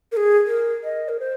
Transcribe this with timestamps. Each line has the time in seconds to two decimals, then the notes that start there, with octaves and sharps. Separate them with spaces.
0.12 A#4
0.17 G#4
0.47 A#4
0.84 D#5
1.09 A#4
1.20 C5